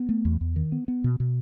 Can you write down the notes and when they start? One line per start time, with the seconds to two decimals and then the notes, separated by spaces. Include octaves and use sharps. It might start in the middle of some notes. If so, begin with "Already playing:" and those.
Already playing: B3
0.09 A3
0.25 E2
0.41 E2
0.56 D#3
0.72 B3
0.88 B3
1.04 B2
1.20 B2